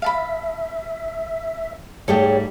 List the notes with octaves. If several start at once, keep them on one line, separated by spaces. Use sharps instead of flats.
E5 F5 A5 B5
G#2 G3 A3 G#4 A4 C#5 G5